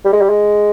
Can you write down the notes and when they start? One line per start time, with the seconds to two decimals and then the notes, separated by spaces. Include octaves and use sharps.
0.05 G3
0.13 G#3
0.21 G3
0.30 G#3